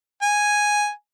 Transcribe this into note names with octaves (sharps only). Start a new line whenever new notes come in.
G#5